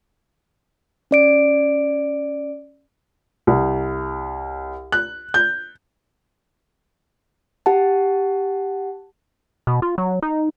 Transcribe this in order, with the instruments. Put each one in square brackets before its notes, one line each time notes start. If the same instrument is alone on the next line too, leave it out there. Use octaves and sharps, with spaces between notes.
[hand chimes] C#4 D5 D7
[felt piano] C2
F#6
G6
[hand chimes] G4 F#5 A5
[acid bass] B2
F4
F#3
D#4